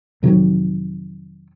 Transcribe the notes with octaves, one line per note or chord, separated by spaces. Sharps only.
F2 C3 D#3 F#3